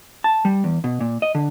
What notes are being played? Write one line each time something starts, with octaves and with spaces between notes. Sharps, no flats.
A5
G3
E2
B2
A#2
D#5
D3